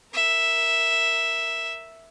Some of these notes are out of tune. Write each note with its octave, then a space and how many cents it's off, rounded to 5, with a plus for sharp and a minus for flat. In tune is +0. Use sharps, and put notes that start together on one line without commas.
A#4 +0 E5 +0